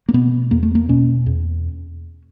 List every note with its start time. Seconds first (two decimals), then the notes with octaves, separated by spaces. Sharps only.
0.09 A#3
0.13 B2 B3
0.51 E2 A#3
0.63 A3
0.75 A#3
0.89 B2 C#4
1.26 E2